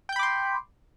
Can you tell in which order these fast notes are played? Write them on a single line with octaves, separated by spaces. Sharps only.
G5 G6 B5 D6 C6